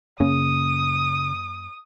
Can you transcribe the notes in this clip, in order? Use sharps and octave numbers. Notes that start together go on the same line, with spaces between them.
F#2 C#3 A#3 C#4 D#6